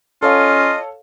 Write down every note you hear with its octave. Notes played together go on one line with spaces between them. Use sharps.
C#4 F4 A4 C#5 D#5 F5